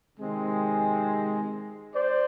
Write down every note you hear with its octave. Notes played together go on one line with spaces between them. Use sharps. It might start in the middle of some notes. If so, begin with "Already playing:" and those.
C3 D#3 G#3 C4
C5 D5